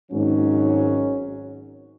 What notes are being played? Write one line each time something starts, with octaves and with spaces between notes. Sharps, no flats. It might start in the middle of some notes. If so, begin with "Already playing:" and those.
G#1 G#2 F#3 C#4